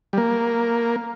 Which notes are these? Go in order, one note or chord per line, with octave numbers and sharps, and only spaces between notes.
G3
A#3